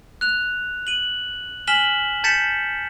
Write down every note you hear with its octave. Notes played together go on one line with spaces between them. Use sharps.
F#6 F7
D#7 F#7
G#5 F6 B6 E7 F#7 G7
A5 G6 A6 B6 C#7 E7